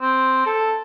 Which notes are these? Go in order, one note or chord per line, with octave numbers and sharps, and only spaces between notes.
C4
A4